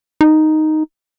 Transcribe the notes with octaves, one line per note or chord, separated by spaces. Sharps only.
D#4